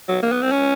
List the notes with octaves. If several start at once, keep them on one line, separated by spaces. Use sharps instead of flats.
F#3
A#3
B3
C4
C#4